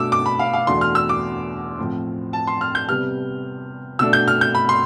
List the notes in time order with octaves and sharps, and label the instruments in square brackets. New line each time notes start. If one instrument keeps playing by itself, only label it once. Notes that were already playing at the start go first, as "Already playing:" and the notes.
Already playing: [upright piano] B2 A3 D4 D6 E6
D6
B5
F5
F5
E2 B2 A3 D4 C6
F6
E6
D6
A2 F3 C4
A5
C6
F6
G6
C3 G3 B3 F6
B2 A3 D4 E6
G6
F6
G6
B5
C6